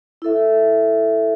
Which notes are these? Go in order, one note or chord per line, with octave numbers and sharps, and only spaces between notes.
E4 A4 E5